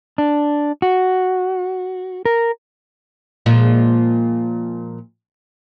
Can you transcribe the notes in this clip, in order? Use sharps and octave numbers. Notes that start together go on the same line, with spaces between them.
D4
F#4
A#4
A#2 F3 G#3